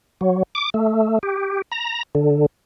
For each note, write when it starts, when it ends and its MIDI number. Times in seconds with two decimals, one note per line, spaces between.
0.21 0.43 54
0.55 0.70 86
0.74 1.19 57
1.23 1.62 67
1.72 2.03 82
2.15 2.46 50